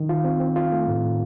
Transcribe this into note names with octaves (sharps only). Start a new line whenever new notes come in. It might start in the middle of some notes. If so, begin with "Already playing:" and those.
Already playing: D#3
F4
C4
C4
F4
A3
A2